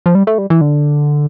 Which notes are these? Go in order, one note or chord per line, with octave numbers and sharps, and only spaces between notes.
F3
G3
A3
G3
E3
D3